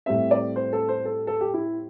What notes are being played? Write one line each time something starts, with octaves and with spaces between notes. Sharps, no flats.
A2 G3 C4 E5
D5
C5
A4
C5
A4
A4
G4
E4